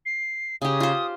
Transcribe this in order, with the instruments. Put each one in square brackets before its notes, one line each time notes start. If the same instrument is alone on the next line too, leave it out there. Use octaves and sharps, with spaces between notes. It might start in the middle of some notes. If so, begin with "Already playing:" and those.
[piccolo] C7
[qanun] C#3 G4 [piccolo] D#6
[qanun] F4 C5